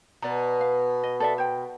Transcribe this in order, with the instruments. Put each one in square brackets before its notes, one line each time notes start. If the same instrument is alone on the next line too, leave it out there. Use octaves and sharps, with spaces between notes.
[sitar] B2 [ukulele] D5 A#5
[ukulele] F5
D#5
A4 D5 E5
C5 G5